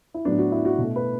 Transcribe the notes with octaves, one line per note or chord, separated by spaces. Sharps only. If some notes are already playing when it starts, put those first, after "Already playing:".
E4
A2 F#3 B3 D4
F#4
E4
F#4
B2 A3
B4